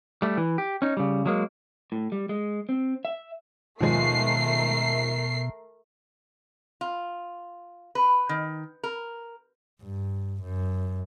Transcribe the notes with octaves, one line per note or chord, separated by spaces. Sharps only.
G3 A3
E3
G4
C#4 D#4
C#3 G3
F#3 G#3 A#3
A2
G3
G#3
C4
E5
D#2 B2 F3 G#3 A3 A#4 C7
F4
B4
D#3
A#4
G2
F#2